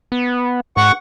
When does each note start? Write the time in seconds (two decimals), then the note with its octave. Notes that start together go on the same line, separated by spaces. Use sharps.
0.12 B3
0.77 G#2 F#5 C#6